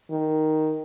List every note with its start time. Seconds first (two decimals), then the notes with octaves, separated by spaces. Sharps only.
0.11 D#3